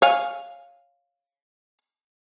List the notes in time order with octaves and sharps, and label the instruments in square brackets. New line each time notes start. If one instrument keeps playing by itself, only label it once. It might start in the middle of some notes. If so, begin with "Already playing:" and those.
[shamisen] C#5 F5 G#5